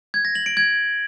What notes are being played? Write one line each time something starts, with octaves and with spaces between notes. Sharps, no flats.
G#6
A#6
F#7
D7
G#6